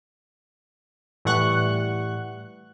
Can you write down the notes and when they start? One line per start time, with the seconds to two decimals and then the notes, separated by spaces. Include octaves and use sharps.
1.25 A2 E3 G3 F#5 C#6 F#6